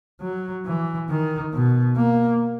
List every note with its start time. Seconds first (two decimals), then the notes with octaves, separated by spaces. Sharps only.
0.21 F#3
0.66 E3
1.09 D#3
1.53 B2
1.97 A#3